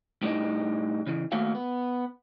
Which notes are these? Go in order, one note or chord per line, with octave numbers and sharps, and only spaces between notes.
A2 G3 D4 D#4
C#3 E3
D#2 A3 A#3 F#4 F5
B3